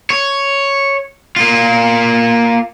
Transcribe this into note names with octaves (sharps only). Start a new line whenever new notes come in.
C#5
A#3 F4